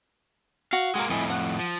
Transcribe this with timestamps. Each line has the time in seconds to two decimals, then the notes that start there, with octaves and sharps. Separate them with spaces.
0.73 F#4 F5
0.95 G#3 A#3 F#4 F5 A#5
1.09 F2 A2 E4 D#5 G#5
1.30 F#5
1.59 F3